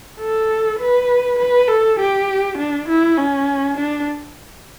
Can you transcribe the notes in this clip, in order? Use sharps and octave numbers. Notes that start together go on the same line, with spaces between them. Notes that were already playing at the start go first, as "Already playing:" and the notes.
A4
B4
B4
A4
G4
D4
E4
C#4
D4